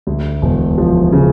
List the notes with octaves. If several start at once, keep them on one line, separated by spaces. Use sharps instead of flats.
D2
E1
F3
C#3